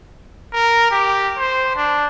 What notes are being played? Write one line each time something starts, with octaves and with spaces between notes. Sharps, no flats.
A#4
G4
C5
D4